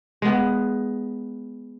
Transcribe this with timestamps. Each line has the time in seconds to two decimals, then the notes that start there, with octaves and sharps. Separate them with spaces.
0.22 G#3 B3